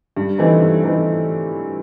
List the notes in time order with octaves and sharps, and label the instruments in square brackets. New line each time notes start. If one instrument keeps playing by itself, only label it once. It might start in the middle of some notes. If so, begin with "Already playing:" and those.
[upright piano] G2
E3 A3 C4 D#4
G2
E3 A3 C4 D#4